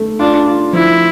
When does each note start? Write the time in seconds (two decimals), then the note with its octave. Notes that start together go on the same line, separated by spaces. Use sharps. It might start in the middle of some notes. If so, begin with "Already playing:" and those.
Already playing: A3
0.19 D4 F4
0.46 F4
0.73 F3 E4